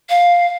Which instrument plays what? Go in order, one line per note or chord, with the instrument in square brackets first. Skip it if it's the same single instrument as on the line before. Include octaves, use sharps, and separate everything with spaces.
[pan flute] F5